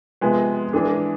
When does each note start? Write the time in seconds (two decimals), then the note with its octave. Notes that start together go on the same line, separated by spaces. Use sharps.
0.21 C3 F3 G#3 B3
0.73 E3 G#3 D4 G#4